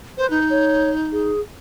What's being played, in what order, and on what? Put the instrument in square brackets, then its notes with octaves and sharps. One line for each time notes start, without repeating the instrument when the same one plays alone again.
[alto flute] B4 [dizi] C5
[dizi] D#4
[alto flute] C#5
G#4